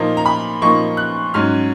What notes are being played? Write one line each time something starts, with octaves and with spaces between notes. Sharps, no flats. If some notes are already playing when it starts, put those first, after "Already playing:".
Already playing: A#2 F3 A#3 D#4
A#5
B5
A#2 F3 A#3 D#4 C#6
F#6
G#2 F#3 C#4 F6